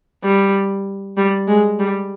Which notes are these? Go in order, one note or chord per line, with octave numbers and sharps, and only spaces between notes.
G3
G3
G#3
G3